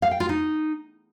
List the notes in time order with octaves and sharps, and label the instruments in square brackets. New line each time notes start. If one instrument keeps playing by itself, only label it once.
[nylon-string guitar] F5
G5
F4
D#4